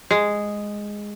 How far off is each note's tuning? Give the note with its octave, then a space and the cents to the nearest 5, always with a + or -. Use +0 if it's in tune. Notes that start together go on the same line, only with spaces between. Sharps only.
G#3 -5